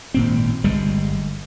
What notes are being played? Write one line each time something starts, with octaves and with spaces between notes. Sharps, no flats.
G#1 A#2 C4
G1 G3 G#3